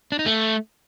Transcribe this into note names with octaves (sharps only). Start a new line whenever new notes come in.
D4
D#4
A3